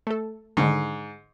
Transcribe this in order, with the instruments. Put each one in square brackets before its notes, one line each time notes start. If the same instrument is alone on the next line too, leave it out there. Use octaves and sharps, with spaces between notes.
[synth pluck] A3 A4
[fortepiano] G#2 [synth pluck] D3 D#3